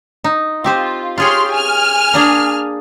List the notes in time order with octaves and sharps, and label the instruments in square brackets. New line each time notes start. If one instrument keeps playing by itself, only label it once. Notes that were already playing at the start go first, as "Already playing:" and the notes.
[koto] D#4
[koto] C4 G4 C5 [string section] F4
[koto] F4 G#4 C#5 [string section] G4 C6 F6
[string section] G#5 F6
[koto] A#3 D4 G#4